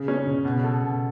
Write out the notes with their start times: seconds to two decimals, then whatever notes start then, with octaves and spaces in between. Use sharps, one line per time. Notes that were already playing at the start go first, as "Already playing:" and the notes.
Already playing: C#3
0.08 C#4
0.27 C#3
0.45 B2
0.64 A4
0.82 B2